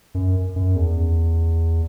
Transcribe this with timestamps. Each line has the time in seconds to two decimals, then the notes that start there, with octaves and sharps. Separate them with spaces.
0.14 F#2
0.56 F#2
0.76 E2